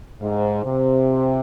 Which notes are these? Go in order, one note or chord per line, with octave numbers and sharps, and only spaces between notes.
G#2 C4 G4 C5 F5
C3 C4 G4 C5 F5
F3 G#3 D#4